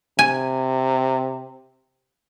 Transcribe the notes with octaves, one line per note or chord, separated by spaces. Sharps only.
C3 G#5